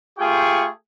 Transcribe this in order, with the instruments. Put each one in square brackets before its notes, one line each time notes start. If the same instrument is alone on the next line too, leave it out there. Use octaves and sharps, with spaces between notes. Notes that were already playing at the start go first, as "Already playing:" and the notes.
[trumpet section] A3 F4 G4 G#4 G5 C#6